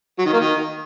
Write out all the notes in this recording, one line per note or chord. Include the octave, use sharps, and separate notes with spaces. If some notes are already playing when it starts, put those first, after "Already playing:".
F#3
D#3
A#3
D#3